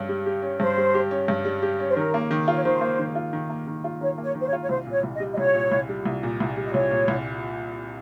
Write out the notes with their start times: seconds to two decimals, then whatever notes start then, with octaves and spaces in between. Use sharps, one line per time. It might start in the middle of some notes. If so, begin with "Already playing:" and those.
Already playing: G2 C#4
0.09 G3
0.26 G4
0.42 C#4
0.59 G2 C5
0.77 G3
0.94 G4
1.11 C#4
1.28 G2
1.45 G3
1.62 G4
1.80 C#4
1.89 C5
1.96 D#3 A#4
2.14 A#3
2.31 D#3
2.48 F4
2.53 C#5
2.64 D#3 C5
2.81 A#3
2.99 D#3
3.15 F4
3.33 D#3
3.50 A#3
3.68 D#3
3.84 F4
4.01 D#3 C#5
4.18 A#3
4.23 C#5
4.35 D#3
4.41 C5
4.47 C#5
4.53 F4
4.64 C#5
4.69 C2 C5
4.86 A#2 C#5
5.03 C2
5.14 D#5
5.20 G3
5.33 D#5
5.38 C2 C#5
5.54 A#2
5.72 C2
5.89 G3
6.06 C2
6.23 A#2
6.40 C2
6.57 G3
6.66 D#5
6.73 C2 C#5
6.91 A#2
7.08 C2